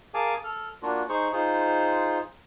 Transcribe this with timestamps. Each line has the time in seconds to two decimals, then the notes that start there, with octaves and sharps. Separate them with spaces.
0.14 G#4 A#4 F5 G#5 A5 D6
0.44 A4 F6
0.82 A#3 D4 F4 F#4
1.09 D#4 G#4 C5 C#6
1.33 D#4 F4 G#4 C5